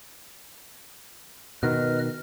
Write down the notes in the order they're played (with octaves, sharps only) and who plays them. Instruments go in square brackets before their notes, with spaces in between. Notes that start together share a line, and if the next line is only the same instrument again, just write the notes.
[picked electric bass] B2 D#3 [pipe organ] B4 D#5 F6